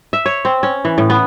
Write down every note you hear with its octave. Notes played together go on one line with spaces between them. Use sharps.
E5
C#5
C4
C#4
E3
A2
B3